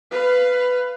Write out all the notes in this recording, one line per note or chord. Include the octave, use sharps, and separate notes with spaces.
B4 F5